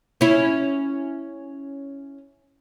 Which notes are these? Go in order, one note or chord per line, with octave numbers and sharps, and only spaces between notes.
C#4 E4